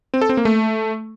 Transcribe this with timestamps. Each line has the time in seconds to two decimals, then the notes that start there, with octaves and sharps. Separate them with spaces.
0.14 C4
0.21 A4
0.29 C4
0.37 A#3
0.45 A3